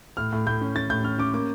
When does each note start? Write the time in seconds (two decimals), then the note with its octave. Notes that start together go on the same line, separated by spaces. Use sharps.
0.17 A2 F6
0.33 A2
0.47 A2 G6
0.61 C#4
0.75 C#4 A6
0.90 A2 G6
1.04 C#4 F6
1.18 C#4 D6
1.33 A#3 D6